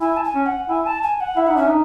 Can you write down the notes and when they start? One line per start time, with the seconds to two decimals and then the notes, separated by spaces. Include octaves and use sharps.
0.01 E4 G#5
0.17 A5
0.24 G#5
0.35 C#4
0.46 F#5
0.69 E4 G#5
0.86 A5
1.03 G#5
1.20 F#5
1.36 E4 E5
1.47 D#4 F#5
1.56 C#4 E5
1.67 D#4